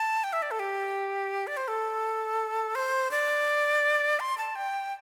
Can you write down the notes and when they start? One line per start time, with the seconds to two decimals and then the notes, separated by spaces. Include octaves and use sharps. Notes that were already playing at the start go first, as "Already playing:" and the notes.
Already playing: A5
0.24 G5
0.33 E5
0.42 D5
0.51 A4
0.59 G4
1.47 D5
1.57 C5
1.68 A4
2.75 C5
3.11 D5
4.20 C6
4.38 A5
4.55 G5